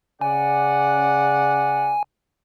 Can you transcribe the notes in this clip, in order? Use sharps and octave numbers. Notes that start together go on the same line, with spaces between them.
C#3 D5 F#5 G#5